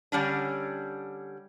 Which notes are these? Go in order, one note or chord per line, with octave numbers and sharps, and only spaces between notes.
D3 G3 C#4 D4